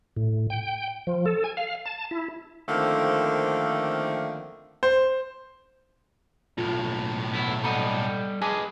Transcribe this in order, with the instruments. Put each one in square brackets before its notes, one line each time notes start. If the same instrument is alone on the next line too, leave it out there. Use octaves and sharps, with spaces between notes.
[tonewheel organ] A2
G5
F3
A4
G#5
F5
A5
E4
[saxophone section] D3 D#3 F3 A3 A#3 C4
[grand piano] C5
[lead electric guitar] B1 A2 [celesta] F4
[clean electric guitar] B3 E4
[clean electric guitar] G3 A4 D#5 [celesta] F#5 A#5 B5
[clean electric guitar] G#4 B4 D#5 [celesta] G#5 A5 D6